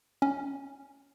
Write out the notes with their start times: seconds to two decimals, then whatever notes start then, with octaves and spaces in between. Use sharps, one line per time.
0.22 C#4